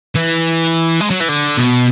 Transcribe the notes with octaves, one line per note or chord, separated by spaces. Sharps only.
E3
G#3
F#3
E3
D3
B2